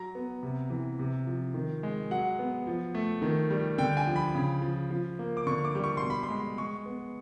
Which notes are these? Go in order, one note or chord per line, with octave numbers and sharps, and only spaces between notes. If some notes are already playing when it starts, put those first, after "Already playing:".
Already playing: F#3 A#5
B3
C3
E3
C3
F3
D#3
G#3
F#3 F#5
B3
F3
A3
D#3
G3
D3 G5
G#5
F3
B5
C#3
F3
F3
A#3
D6
D3 C#6
D6
G3
C#6
B2 C6
B5
C6
G#3
G#3 C#6
B3